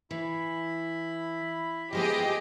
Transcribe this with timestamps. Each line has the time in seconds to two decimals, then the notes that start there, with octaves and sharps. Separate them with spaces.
0.11 E3 E4 B5
1.93 F3 G#3 B3 G4 G#4 D#5